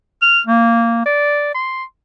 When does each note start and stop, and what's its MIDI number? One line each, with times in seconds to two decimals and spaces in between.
0.22 0.40 89
0.47 1.03 58
1.06 1.53 74
1.54 1.84 84